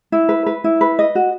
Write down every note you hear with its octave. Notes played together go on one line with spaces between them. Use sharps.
E4
B4
B4
E4
B4
D#5
F#4